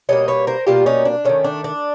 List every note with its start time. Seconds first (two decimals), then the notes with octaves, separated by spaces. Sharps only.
0.09 B2 G3 A#3 C#5 D#5
0.28 B4 C#5
0.47 A#4 C5
0.67 B2 G3 A#3 F4 G4
0.86 C#4 D#4
1.05 D4
1.24 D#3 F#3 A3 C#4
1.44 D4
1.64 D4